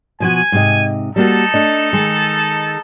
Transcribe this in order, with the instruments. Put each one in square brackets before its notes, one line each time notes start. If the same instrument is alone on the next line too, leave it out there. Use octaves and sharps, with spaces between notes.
[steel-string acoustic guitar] B2 F3 F#4 [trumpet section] G#5
[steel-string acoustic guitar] G#2 C3 D#5
[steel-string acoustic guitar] G3 A#3 F#4 [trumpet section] D#4 A4
[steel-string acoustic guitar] A3 D4 D#5
D#3 G#3 G#4